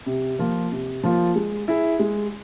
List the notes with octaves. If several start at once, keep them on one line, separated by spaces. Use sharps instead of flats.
C3
F3 A#3 F4
C3
F3 A#3 F4
G#3
E4 G#4
G#3